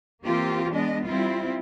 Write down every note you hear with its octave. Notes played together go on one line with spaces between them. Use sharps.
E3 A#3 C4 F4 G4
G#3 B3 D4 D#5
G3 C4 E4 F4